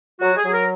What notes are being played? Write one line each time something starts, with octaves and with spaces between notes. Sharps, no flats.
F#3 F#4
G#4
F#3
A#4